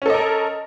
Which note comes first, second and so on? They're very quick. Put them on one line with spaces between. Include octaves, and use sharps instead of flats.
C#4 A4 D#5 A#4